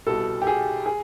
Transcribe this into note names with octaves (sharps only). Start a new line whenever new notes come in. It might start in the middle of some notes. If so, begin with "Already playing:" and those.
C2 B2 A4
G4
G#4
G#4